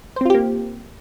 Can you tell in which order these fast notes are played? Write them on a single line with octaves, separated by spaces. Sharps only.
C5 C4 F4 G4 A#3